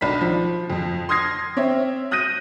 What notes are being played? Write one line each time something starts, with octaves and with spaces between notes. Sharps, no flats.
B1 D4 B5 B6
F3
F2 F3
C6 D#6 F6 G#6 A#6 C7
C4 C#5 E5
D#6 F#6 G6 A#6 D#7